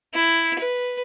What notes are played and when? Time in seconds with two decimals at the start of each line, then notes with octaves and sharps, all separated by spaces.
0.15 E4
0.59 B4